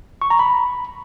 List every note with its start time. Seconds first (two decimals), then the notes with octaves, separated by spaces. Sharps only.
0.22 C#6
0.30 A#5
0.39 B5